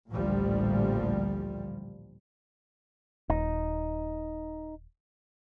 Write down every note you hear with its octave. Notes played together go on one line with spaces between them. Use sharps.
A1 D2 A#2 F3 G3
D#1 D#4